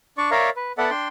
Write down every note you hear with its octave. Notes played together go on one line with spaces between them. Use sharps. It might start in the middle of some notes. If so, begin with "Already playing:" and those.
D4 D5 C#6
A#4 C#5 D5 E5 F5 A#5
B4
B3 A4 D5 E5 F#5
D4 G5 C6